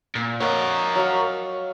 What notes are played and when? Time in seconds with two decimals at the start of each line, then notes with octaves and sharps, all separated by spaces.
0.16 A#2
0.41 A#4 C#5 D#5 F5 F#5
0.95 F#3 F5 C#6